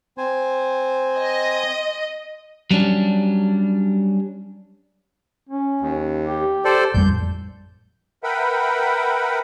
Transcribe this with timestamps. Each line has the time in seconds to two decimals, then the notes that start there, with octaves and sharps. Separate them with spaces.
0.18 C4 C5 G#5
1.18 D#5
2.71 F#3 G3 C#4 D4
5.49 C#4
5.81 D#2
6.25 G4
6.65 A4 C5 D5
6.94 A1 F2 G3 G6
8.23 A#4 B4 E5 F#5 G5 B5